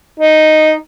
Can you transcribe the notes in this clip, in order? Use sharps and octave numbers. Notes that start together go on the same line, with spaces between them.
D#4